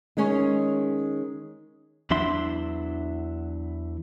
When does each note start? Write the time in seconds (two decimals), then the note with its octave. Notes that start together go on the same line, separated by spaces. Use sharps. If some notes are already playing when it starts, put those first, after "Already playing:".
0.17 D#3 G#3 C#4 C#5
2.11 E2 F#3 D4 E4 E5 C6